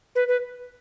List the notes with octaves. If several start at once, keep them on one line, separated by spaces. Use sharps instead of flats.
B4
B4